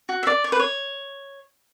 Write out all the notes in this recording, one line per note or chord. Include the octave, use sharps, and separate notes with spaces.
F#4
E5
D5
C#5
B4
C#5